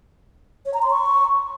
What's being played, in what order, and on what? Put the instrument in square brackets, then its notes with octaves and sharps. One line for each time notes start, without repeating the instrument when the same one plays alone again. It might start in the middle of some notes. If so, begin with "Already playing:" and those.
[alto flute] C#5
A#5
C6
C#6